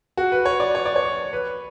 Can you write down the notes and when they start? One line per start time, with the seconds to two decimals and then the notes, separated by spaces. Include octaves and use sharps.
0.17 F#4
0.32 B4
0.45 C#5
0.60 D5
0.75 C#5
0.86 D5
0.96 C#5
1.33 B4